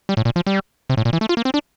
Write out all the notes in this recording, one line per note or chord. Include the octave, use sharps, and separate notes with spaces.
G3
A2
A#2
F3
G3
C3
A2
A#2
E3
A3
F4
A#3
C4
D4